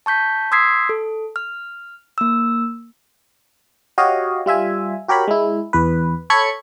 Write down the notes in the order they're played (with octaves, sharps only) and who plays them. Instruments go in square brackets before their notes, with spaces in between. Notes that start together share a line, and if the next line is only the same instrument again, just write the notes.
[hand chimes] A5 C#6 G6 B6
C6 D#6 E6 G#6 B6 C7
A4
F6
A#3 E6
[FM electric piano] F#4 G4 C#5 D#5 F5
G3 F4 E5 G#5
F#4 G4 A#4 C#5 B5
G#3 E4
E2 B4
A4 C#5 B5 G#6 C#7